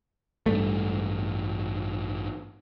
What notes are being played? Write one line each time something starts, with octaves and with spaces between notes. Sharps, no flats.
A1 G2 G3 A3